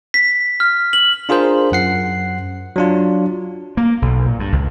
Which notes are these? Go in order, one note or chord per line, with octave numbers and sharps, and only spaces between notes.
B6
F6
F#7
D4 F4 G#4 A#4 C5
F#2 F#5 C7
F#3 D4 F4
A#3
B1
A#2
G2
C#2